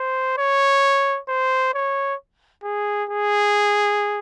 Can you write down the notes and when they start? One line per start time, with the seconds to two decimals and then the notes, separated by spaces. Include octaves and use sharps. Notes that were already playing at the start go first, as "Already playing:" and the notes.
Already playing: C5
0.38 C#5
1.29 C5
1.74 C#5
2.64 G#4
3.09 G#4